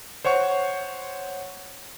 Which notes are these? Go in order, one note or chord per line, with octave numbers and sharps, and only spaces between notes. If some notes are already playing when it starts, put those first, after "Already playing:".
C5 C#5 F#5 C#6